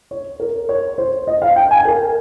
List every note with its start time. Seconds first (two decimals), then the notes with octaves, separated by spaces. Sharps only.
0.11 C#5
0.40 A#4
0.69 C#5
0.98 C5
1.27 D#5
1.42 F5
1.56 G5
1.71 G#5
1.85 A#4